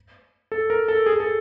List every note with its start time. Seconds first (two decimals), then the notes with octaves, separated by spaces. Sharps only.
0.52 A4
0.70 A#4
0.88 A4
1.06 G#4
1.20 A4